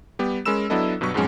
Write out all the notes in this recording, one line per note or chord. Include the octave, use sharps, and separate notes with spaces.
G3 B3 G4
G#3 C#4 A#4 B5 E6 E7
F#3 B3 D4 E4 A4 D#5
G2 B2 F#3 B4 C#6
F2 G#2 B2 F#3 G#3 C#4